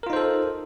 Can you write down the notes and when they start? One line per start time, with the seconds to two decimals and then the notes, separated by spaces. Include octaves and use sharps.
0.03 A#4
0.07 F4
0.10 D#4
0.13 C5
0.16 A4